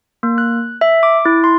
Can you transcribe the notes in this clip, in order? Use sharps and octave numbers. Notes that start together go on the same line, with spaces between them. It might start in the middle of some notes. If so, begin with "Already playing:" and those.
A#3
F#6
E5
D6
E4
C6